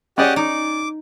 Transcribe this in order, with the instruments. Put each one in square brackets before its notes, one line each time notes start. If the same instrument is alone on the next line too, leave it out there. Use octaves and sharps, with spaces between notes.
[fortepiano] C#4 G#4 D5 [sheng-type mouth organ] G4 D#5 F#5
[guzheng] D#4 [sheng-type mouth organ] D6